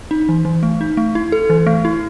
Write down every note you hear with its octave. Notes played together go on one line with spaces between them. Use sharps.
D#4
E3
E3
A3
D#4
A3
E4
A4
E3
A3
E4